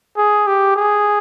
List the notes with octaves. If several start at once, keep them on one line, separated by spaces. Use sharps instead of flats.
G#4
G4
G#4